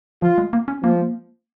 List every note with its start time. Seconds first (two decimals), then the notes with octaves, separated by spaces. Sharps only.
0.22 F3 F4
0.38 G#3
0.53 A#3
0.68 C#4
0.83 F3 A#3
0.92 G#3
1.01 A#3